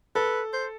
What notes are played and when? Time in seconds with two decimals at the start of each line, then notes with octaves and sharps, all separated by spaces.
0.15 A4 B4
0.53 C5